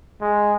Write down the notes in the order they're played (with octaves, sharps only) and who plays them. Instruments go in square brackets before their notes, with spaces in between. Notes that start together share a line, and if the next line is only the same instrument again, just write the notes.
[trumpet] G#3